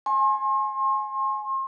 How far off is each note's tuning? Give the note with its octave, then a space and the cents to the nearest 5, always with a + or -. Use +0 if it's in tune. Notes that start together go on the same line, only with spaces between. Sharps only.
G#5 +20 C6 +40